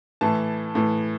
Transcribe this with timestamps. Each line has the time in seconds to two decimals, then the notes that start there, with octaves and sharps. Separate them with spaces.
0.21 A2 E3 A5
0.75 A2 E3